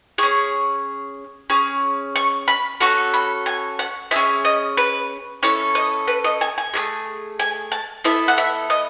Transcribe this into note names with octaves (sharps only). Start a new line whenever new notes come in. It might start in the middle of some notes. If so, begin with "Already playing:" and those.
C#4 G#4 C#6
C#4 G#4
C#6
B5
C#4 F#4 A4 C#6
B5
G#5
F#5
C#4 G#4 E5
D#5
B4
C#4 E4 A4 C#5
D#5
B4
D#5
G#5
G#5
A3 D#4 G#4
G#5
A5
B3 E4 A4 E5
F#5
E5
D#5